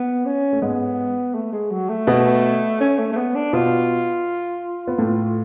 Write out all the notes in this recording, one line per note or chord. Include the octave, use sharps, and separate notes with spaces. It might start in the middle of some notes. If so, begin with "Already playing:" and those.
Already playing: B3
C#4
A3
G#2 G#3 B3
A3
G#3
F#3
A3
B2 B3
C#4
A3
A3
B3
D4
B2 B3 F4
B3
A2 A3